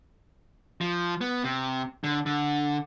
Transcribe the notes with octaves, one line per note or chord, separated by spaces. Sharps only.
F3
B3
C3
D3
D3